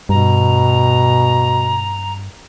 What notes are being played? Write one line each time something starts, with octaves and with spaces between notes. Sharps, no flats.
G2 B2 A#5